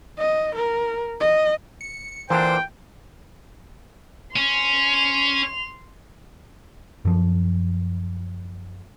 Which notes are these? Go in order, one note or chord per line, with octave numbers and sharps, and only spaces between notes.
D#5
A#4
D#5
C#7
A#2 D3 E3 D4 C5 G5
C#4 C6 F7
F#2 F3